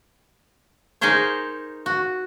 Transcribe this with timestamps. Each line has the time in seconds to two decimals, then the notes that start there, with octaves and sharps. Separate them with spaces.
1.01 D#4 G#4 A#4 C5 C#5
1.86 F#4